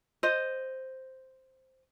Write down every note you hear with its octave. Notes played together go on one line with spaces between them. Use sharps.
C5 D#5